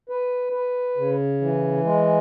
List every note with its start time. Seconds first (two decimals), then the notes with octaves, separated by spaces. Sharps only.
0.09 B4
0.53 B4
0.97 C#3
1.41 E3
1.85 G#3